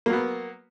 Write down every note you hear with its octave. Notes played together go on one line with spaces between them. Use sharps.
F#3 A#3 B3